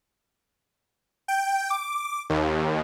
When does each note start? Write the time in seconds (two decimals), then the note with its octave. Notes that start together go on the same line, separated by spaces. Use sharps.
1.28 G5
1.70 D6
2.30 D#2